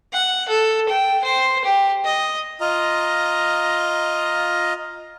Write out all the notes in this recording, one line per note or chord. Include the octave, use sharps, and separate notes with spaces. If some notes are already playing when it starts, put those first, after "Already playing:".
F#5
A4
G5
C5
G4
D#5
F4 D#5 A#5